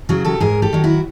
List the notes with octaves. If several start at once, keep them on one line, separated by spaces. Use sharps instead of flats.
C#3 F#3 F#4 G#4
G4 A4
G#2 G#4 A#4
G4 A4
D#3 F#3
E4 F#4